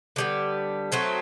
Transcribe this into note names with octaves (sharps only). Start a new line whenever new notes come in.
D3 G3 B3
F#3 A3 C4 D#4